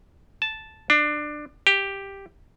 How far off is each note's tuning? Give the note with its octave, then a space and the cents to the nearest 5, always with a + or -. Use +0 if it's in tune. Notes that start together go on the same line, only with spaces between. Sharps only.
A5 -5
D4 +20
G4 +5